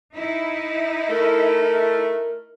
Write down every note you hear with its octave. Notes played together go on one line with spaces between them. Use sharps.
D#4 E4
A3 A#4